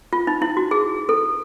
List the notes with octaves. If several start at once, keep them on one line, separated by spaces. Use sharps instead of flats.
F4
D#4
E4
F#4
G#4
A4